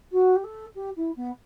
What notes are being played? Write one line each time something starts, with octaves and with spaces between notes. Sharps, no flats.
F#4
G4
A4
G4
E4
B3